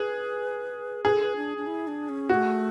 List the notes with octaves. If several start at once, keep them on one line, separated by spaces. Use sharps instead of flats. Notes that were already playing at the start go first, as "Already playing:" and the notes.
Already playing: G#4 B4
G#4 B4
A4
B4
D4
D4
E4
D4
C#4
A3 B3 F#4